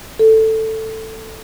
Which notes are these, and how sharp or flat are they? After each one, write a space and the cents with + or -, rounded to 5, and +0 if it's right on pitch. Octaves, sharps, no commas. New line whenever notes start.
A4 +10